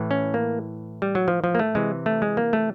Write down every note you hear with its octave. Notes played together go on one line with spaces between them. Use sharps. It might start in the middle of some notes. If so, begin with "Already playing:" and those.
Already playing: A2 E3
C#4
A#3
G3
F#3
F3
F3
A#3
A3
C3 E3 G#3
A3
G#3
A#3
A3